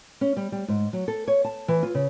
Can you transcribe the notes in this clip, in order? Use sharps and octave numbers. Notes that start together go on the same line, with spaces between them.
C#4
G3
G3
G#2
F#3
A4
C#5
A5
E3
F4
C#3